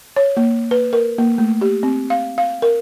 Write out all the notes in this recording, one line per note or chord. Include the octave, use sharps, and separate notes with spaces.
C#5
A#3
B4
A#4
A#3
A3
G4
C4
F5
F5
A#4